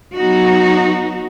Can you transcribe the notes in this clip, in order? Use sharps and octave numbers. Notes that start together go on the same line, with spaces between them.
F#3 B3 D#4 F#4